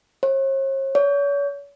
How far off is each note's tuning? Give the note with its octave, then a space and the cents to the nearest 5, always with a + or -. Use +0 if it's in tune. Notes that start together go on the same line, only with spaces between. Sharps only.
C#5 -45
C#5 +40